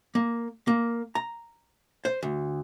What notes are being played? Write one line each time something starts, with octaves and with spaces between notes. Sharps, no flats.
A#3
A#3
A#5
C5
D2